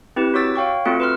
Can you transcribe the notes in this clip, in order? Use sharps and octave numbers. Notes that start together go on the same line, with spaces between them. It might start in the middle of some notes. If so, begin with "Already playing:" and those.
C4 E4 G4 B4
F#4 C#5 D6 E6 A6 B6
C#5 F5 G5 C#6
A3 C4 F4 F#4 A4 C#7
B4 C6 F6